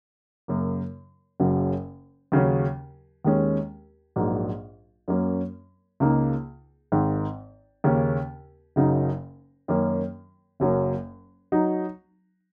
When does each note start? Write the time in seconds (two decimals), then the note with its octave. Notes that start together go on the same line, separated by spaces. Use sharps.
0.48 F#2 C#3 A#3
1.40 F#1 F#2 C#3 F#3 C#4
2.32 D#2 C#3 F#3 C#4
3.25 D#2 D#3 G#3 C#4
4.16 A#1 G#2 F#3 A#3
5.08 F#2 F#3 A#3 C#4
6.00 C#2 C#3 A#3 D#4
6.92 G#1 G#2 D#3
7.84 D#2 C#3 A#3 C#4
8.76 F#1 F#2 C#3 F#3 D#4
9.68 F#2 D#3 A#3 C#4
10.60 F#1 F#2 F#3 A#3 C#4
11.52 F#3 D#4